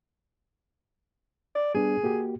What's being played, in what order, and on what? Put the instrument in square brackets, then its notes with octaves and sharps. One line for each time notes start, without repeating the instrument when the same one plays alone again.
[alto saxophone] D5
[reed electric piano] G3 B3 D4 [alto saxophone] G#4
[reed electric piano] A#3 F#4 G4